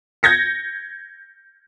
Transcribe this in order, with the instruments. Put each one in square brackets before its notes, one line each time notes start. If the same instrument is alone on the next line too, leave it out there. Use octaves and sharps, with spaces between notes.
[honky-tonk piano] G6 G#6 A#6 C#7